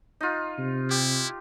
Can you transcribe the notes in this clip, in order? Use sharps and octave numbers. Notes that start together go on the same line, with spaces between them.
D#4 F4
C3
E4 G4